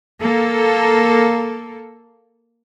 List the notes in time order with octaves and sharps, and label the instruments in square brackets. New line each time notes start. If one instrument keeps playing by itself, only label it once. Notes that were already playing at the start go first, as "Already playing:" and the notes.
[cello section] A#3 A4